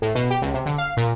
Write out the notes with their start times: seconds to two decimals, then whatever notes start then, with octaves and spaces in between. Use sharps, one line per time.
0.02 A2
0.15 B2
0.30 G4
0.42 C#2
0.54 C3
0.66 D3
0.78 F5
0.97 A#2